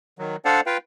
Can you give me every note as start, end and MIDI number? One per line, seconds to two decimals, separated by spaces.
0.19 0.36 51
0.19 0.36 54
0.45 0.61 62
0.45 0.61 69
0.45 0.61 72
0.45 0.61 74
0.45 0.61 77
0.45 0.61 78
0.66 0.77 65
0.66 0.77 71
0.66 0.77 77
0.66 0.77 79